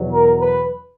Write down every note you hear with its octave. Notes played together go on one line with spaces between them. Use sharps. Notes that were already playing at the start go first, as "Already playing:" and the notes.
Already playing: E2 B2 F#3
A#4
B4